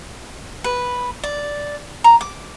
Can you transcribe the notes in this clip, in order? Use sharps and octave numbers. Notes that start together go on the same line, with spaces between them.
B4
D5
A#5
D6